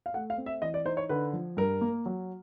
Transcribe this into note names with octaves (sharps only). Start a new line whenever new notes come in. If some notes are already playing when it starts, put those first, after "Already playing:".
F5
A3 F#5
F5
C4
E5
E3 D#5
D5
D#4 C5
C#5
D3 B4
F3
G2 A#4
A#3
F#3